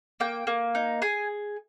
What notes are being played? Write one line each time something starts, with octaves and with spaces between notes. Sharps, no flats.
A#3 G5
A#3
D#4
G#4 G#5